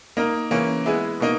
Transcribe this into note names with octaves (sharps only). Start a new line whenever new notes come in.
A#3 D#4 A#4
C#3 E3 A#3 C#4
G#3 B3 E4 G#4
B2 A#3 D#4